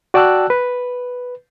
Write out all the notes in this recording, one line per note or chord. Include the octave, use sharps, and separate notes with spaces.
F#4 D5 G5 A5 E6 F#6
B4